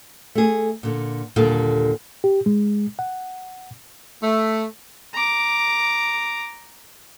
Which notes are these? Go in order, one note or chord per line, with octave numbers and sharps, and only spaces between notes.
A3 G#4
A#2 D3
D#2 A#2 D3 G3 F4 A4
G4
G#3
F#5
A3
A#5 D6